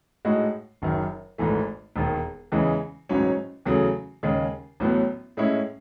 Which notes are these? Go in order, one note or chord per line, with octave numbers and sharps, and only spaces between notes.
A2 G#3 D#4 F#4
F#1 F#2 D#3
G#1 G#2 E3 A3
E1 D#2 D#3
E2 C#3 E3 G#3
A1 G#2 F#3 C#4
E2 C#3 F#3 A3
D#2 C#3 G#3
A1 A2 F#3 B3
A2 G#3 C#4 E4